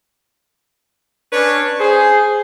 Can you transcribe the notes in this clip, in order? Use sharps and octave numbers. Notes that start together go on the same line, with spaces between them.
C#4 D4 B4 C#5
G#4 C5